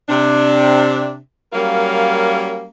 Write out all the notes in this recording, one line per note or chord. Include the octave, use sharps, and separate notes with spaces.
C3 D4
F#3 G3 A#3 C#4 A#4 F5